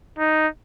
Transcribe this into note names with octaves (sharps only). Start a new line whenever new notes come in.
D#4